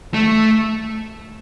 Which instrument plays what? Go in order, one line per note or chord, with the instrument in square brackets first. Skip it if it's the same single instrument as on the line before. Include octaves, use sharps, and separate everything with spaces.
[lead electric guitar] A3